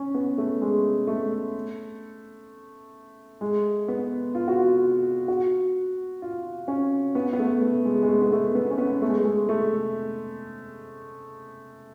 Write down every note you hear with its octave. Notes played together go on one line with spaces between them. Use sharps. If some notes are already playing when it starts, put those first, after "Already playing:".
Already playing: C#4
B3
A3
G#3
A3
G#3
B3
F4
F#4
F4
F#4
F4
C#4
B3
B3
A3
A3
G#3
G#3
A3
B3
A3
B3
C#4
B3
A3
G#3
G#3
A3